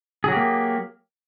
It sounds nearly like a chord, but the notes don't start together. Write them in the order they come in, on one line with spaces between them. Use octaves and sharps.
G#4 F#3 G4 A#3